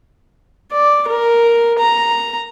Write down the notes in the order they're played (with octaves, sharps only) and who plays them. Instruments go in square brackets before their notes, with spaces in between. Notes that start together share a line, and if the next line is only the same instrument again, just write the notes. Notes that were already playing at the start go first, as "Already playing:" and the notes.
[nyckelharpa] D5
A#4
A#5